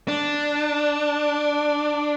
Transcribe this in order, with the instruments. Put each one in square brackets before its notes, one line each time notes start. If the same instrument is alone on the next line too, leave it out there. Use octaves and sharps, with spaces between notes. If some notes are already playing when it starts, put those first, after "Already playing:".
[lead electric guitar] D4